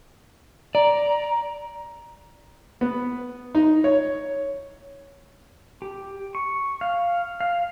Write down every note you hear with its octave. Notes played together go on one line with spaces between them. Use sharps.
D5 A#5
B3
D#4
C#5
G4
C#6
F5
F5